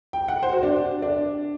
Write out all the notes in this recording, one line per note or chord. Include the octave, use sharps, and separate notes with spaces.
G5
F#5
C5
F#4
D4
D4